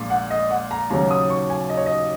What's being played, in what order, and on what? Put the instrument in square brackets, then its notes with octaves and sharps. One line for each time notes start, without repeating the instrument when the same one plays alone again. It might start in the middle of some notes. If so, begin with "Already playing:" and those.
Already playing: [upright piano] A#1 A#2 G#3
[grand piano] F#5
D#5
F#5
A#5
[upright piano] D#2 C#3 F#3 C#4 [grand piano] A#5
[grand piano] D#6
C#6
G#5
D#5
C#5
D#5